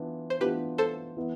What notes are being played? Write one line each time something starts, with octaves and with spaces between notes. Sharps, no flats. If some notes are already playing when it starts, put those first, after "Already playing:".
Already playing: E3 B3 D4 F4
C5
E3 B3 D4 F4 G4 B4
A4 C5
E3 B3 E4